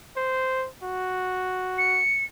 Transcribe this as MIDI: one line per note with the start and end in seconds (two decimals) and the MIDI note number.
0.17 0.68 72
0.83 2.03 66
1.78 2.24 97